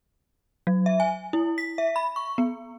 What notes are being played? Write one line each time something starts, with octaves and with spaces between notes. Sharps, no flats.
F#3
E5
G#5
E4
B6
E5
B5
C#6
B3